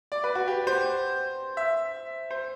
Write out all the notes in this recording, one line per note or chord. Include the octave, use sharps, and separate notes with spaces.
D5
B4
F#4
G4
C5
E5
C5